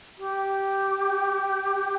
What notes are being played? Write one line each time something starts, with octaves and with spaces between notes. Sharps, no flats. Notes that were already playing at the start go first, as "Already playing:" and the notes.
G4